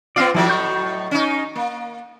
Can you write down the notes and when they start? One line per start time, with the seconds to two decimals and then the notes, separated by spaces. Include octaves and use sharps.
0.16 B3 C4 F4 D5 F5
0.34 A2 F3 F#3 A3 E4
0.49 D#5 C#6 G6
1.11 C#4 D#4
1.56 A#3